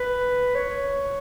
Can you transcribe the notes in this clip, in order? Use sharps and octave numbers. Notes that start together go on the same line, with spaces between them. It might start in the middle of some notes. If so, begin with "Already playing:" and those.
Already playing: B4
C#5